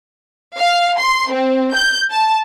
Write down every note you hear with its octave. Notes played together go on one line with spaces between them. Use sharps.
F5
C6
C4
G6
A5